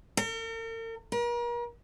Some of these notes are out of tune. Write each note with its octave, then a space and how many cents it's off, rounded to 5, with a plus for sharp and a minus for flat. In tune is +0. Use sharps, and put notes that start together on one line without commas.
A#4 -45
A#4 +40